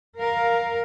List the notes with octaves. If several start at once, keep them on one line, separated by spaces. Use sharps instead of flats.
A#4 F5